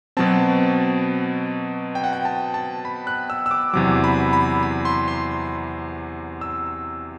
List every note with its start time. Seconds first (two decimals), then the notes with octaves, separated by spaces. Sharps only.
0.17 B2 F#3 C4 A5
1.95 G5
2.04 F#5
2.13 G5
2.25 A5
2.54 A5
2.85 B5
3.07 F#6
3.30 E6
3.46 E6
3.51 D6
3.73 E2 C3 F#3 D6
4.04 B5
4.33 B5
4.63 B5
4.85 C6
5.08 C6
6.41 E6